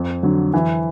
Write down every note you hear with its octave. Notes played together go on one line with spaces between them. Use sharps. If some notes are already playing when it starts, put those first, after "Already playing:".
Already playing: F2
D3 F#3
E3